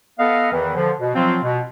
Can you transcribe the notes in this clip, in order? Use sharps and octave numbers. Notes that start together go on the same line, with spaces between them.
B3 A4 D#5 F5
E2 D#3 E3
D3 F3
B2
F3 F#3 C4 F4
B2